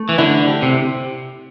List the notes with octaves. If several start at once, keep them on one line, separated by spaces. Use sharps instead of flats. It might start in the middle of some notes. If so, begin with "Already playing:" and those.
Already playing: A3
E3
D3 E4
G4
C3